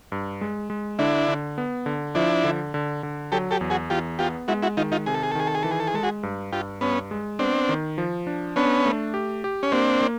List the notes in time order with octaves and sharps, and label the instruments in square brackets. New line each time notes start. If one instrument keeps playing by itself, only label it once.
[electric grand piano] G2
G#3
G#3
[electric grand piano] D3 [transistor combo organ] D4 E4
[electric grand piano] D3
B3
D3
[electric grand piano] F3 [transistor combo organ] D4 E4
[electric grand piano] D3
D3
D3
[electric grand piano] F#3 [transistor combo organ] G4 A4
[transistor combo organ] G4 A4
[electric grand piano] E2
[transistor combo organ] F#4 G#4
[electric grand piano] E2 [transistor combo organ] F4 G4
[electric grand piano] B3 [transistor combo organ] F4 G4
[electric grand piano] G#3 [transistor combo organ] E4 F#4
[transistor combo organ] E4 F#4
[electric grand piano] D#3 [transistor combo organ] D#4 F4
[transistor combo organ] D#4 F4
[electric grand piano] C3 [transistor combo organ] G#4
[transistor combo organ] A4
G#4
A4
[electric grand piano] D#3 [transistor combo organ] G#4
[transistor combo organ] A4
G#4
[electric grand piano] E3 [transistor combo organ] A4
[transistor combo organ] G#4
A4
G#4
[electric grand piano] G#3 [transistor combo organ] A4
[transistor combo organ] F#4 G#4
[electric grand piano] G2
[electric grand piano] G2 [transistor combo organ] F4 G4
[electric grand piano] G2 [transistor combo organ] B3 C#4
[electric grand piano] G#3
[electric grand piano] B3 [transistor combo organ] C4 D4
[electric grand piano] D#3
F3
D4
[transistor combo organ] B3 C#4 [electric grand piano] D4
[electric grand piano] A3
G4
G4
[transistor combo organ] C#4
[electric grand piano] A#3 [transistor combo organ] C4 D4
[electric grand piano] A#3